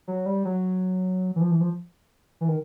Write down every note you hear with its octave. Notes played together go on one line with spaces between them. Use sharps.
F#3
G3
F#3
E3
F3
E3
F3
E3
D#3